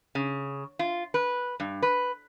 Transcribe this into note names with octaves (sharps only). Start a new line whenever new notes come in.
C#3
F4
B4
G2
B4